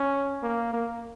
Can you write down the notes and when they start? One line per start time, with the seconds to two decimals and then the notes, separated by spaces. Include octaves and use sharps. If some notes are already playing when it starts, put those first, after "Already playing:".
Already playing: C#4
0.42 A#3
0.73 A#3